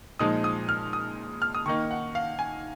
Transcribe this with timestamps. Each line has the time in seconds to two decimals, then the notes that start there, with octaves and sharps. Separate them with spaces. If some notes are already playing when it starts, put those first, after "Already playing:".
0.19 A#2 F3 G#3 D#4 D#6
0.44 D#6
0.69 F6
0.93 D#6
1.42 F6
1.55 D#6
1.66 D#3 A#3 D#4 C#6
1.91 F#5
2.15 F5
2.39 G#5